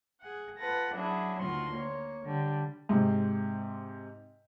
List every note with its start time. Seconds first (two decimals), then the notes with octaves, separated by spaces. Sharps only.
0.21 G#4 F#5
0.58 F4 A4 B4 F#5 A#6
0.94 F#3 C#4 D4 E4 G#4
1.41 D2 D3 D#3 F4 F#4 C6
1.73 A#3 C#5
2.24 D3 G3
2.89 G#2 C3